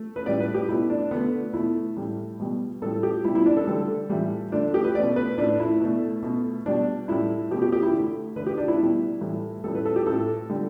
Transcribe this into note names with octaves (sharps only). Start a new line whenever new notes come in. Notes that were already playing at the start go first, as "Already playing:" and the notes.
Already playing: A3
B4
A2 G3 D5
B4
G4
B2 A3 E4
D4
D3 A3 B3
B2 A3 E4
A2 G3
B2 G3
A2 G3 A4
G4
B2 G3 E4
E4
D4
A4
D3 G3 A4
A2 E3 G3
D3 A3 D4
G4
B4
B2 A3 D5
B4
A2 A3 D4
E4
B2 A3
B2 A3
B2 G3 D4
A2 G3 E4
B2 A3 G4
G4
G4
E4
D3 A3
D3 A3 B4
G4
D4
E4
B2 G3
A2 E3 G3
A2 G3 A4
B4
A4
G4
A2 A3 A4
D3 G3